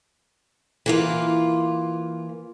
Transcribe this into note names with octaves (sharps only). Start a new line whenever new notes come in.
E3 A#3 F4